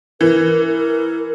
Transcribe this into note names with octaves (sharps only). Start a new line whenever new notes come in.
E3 A#4
A#4